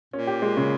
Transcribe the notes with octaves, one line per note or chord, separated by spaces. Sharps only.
A#2 C#4
G4
G#3
C#3